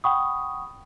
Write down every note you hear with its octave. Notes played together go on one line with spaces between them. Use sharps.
F#5 G5 B5 C#6 D#6